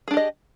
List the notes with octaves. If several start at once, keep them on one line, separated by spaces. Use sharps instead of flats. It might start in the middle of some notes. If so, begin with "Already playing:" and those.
D4 G4 G#4 D#5